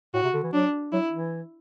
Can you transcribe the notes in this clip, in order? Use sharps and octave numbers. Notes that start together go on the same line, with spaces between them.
A2 F#4
C3
D3
E3
F#3 D4
F#3 E4
E3